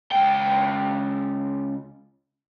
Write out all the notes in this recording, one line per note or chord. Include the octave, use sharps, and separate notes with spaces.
C#2 G5